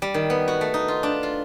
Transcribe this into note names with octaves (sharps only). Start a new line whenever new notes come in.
G3
D#3
B3
F#4
A3
D#4
F4
D4
F4